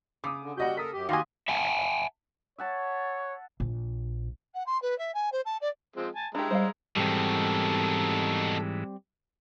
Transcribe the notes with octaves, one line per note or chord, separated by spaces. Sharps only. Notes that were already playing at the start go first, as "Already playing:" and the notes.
C#3 D6 D#6
D3
G3 F#4 G4 D#5 F#5 G6
A4 A#4 D#6 B6
F#2 G4
D#3 F#4 G4 D#5 F5 G#5 C6 D#6
E5 F#5 G#5 A5
C#5 E5 F#5 A5
A#1
F#5
C6
B4
E5
G#5
C5
A5
D5
F3 G#3 C4
G#5 A5
G#3 D4 E4 G4 A#5
G3 C5 D#5 F5
G#2 B2 D#3 E3 G3 C4 A4